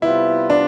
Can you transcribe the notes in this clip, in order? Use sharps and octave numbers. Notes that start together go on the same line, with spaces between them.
C3 G3 B3 E4 F4 B4
D4